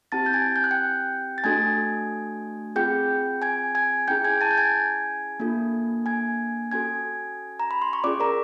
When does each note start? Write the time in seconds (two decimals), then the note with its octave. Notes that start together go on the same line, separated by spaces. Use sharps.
0.12 C4 E4 G4 A5 A6
0.26 G6
0.33 G#5 G#6
0.56 G6
0.64 F#6
0.71 G5 G6
1.38 A6
1.44 A3 D4 F#4 A4 G#5 G#6
2.76 C4 F4 G#4 G5 G6
3.42 G#5 G#6
3.75 G#5 G#6
4.08 C#4 E4 G#4 G5 G6
4.24 G#5 G#6
4.41 A5 A6
4.51 G6
4.58 G#5 G#6
5.40 A#3 D4 F4 A4
6.06 G#5 G#6
6.71 C#4 F#4 A4 G#5 G#6
7.60 A#5
7.71 B5
7.82 C6
7.93 C#6
8.04 C#4 F4 G#4 D5 D6
8.20 A#4 A#5